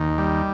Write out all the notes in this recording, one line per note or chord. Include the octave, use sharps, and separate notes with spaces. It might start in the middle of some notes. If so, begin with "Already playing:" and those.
Already playing: D#2
G3